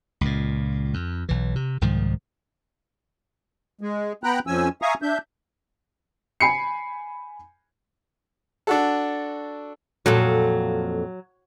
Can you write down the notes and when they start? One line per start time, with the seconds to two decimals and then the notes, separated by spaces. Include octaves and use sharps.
0.21 C#2 A#2
0.94 F2
1.29 B1 E3
1.56 C3
1.81 C2 G#2 D#3 F3
3.81 G#3
4.24 B3 G5 A#5 B5 F#6
4.47 F2 F3 C#4 G#5 E6
4.82 E5 F5 G#5 A#5 C#6 D#6
5.02 D4 E5 G6
6.40 G#5 B5 C7 C#7
8.67 D4 F#4 A4
10.06 F2 A#2 F#3 A4